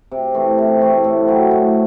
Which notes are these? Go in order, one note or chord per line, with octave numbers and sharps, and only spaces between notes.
C3
E3 A3 C4
C3
E3 A3 C4
A2
F#3 C4
A2